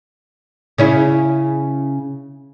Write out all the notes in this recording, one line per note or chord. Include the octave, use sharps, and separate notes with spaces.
C#3 C#4 E4